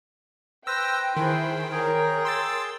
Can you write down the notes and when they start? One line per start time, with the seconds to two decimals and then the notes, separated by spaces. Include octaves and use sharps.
0.67 B4 C5 G5 E6 A#6
1.17 D#3 E4 G#4 C5 G5
1.71 G#4 A#4 C#5 G5
2.25 C6 E6 A6